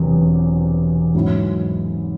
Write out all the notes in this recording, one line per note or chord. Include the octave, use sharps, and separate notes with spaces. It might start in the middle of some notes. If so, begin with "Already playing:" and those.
Already playing: E1 E2 C3 F#3
G#2 F#3 C#4 E4